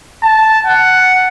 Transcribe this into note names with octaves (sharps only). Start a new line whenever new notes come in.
A5
F#5